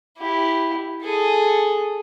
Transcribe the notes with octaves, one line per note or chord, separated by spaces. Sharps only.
E4 G4
G#4 A4